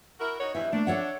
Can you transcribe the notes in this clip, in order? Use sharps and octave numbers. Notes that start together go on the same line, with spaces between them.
E4 F#4 A#4
D#4 F#4 C#5
G2 B2 E3 E5
A3 A#3 D4
A4 C#5 F#5